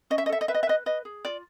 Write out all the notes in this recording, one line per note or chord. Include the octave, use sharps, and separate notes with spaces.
C#4 D#5
E5
D#5
A4 E5
D#5
B4 E5
D#5
E5
B4 D#5
B4 D#5
G#4
F4 D5